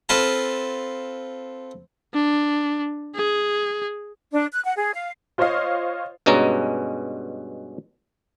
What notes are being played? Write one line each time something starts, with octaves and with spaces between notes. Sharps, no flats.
C4 F4 A4 B4 F5 A5
D4
G#4
D4
F#6
F#5
G#4
F5
F4 C5 C#5 D#5 F5
G2 B2 G#3 C#4 A#5